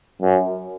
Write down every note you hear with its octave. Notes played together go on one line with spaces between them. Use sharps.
F#2